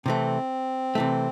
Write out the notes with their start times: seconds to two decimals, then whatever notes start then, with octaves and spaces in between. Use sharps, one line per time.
0.05 C3 E3 A3 C4
0.95 C3 E3 A3